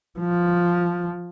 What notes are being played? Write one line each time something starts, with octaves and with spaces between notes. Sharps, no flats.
F3